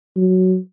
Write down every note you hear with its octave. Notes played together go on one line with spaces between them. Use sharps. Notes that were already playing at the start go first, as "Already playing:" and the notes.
F#3